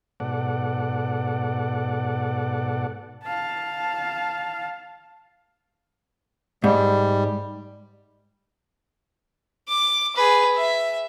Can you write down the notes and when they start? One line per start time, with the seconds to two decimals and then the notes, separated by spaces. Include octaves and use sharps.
0.20 G#2 B2 A4 D5 F#5
3.24 F5 A5
6.64 G#2 G3
9.68 D6
10.15 G#4 B4
10.56 E5